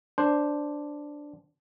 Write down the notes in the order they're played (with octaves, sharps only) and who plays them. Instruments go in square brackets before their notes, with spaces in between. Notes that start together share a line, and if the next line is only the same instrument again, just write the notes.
[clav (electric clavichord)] D4 C5